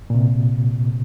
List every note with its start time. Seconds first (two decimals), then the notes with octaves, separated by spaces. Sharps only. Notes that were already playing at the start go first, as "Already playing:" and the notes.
0.10 A#2
0.15 C3